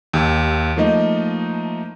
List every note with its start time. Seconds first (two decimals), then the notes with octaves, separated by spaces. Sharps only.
0.14 D#2 G4 E6
0.76 F3 A3 A#3 D#4 D#5